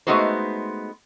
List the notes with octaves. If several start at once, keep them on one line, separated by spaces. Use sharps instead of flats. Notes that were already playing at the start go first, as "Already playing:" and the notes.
G#3 A3 B3 D#4 F#4 C5